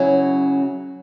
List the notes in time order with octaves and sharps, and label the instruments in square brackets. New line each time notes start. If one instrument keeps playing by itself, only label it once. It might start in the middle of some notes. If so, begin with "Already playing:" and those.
Already playing: [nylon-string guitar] C#3 F#3 C#4 E4